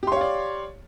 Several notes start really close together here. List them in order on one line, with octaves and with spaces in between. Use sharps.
G4 C6 C#5 F5 D5